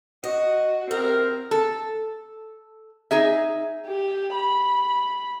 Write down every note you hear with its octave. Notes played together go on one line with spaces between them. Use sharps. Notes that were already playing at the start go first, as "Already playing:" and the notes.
F#4 D#5
A2 C4 A#4
A4
D#4 G#4 E5
G4
B5